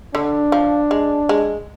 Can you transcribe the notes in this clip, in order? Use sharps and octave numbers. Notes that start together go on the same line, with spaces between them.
D3 D4
F3
G#3
G#3